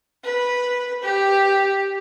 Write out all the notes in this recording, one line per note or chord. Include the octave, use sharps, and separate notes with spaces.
B4
G4